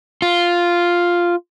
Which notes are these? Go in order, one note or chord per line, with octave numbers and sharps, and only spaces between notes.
F4